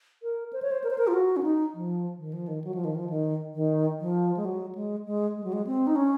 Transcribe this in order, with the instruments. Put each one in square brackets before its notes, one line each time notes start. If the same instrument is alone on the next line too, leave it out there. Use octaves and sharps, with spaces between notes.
[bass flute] A#4
C5
C#5
C5
A#4
C5
A#4
F4
F#4
C#4
D#4
F3
D#3
F3
D#3
F#3
F3
D#3
F3
D#3
D#3
F3
G#3
F#3
G#3
G#3
G#3
F#3
G#3
C4
D#4
C#4